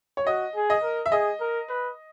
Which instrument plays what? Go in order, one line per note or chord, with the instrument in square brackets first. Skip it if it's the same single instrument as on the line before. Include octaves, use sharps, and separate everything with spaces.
[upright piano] C#5
[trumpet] F#4 [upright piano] D#5
[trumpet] G#4
[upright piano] D#5
[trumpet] A#4
[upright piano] E5
[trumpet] G#4 [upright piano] D#5
[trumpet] A#4
B4